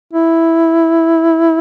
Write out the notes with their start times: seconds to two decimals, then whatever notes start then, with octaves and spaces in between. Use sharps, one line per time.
0.13 E4